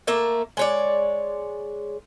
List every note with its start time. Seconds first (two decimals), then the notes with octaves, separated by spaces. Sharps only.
0.07 A3 A#3 E5
0.57 G#3 C#5 D5